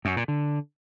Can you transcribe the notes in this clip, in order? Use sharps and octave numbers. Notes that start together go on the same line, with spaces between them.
F#2
A#2
D3